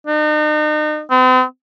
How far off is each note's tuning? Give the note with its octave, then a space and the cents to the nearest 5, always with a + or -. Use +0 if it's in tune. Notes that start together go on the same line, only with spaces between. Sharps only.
D#4 -40
C4 -45